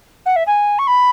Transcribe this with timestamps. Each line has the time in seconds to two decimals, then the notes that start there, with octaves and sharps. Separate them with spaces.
0.25 F#5
0.35 E5
0.46 G#5
0.78 C#6
0.87 B5